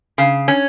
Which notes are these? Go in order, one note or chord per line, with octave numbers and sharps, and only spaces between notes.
C#3
C#4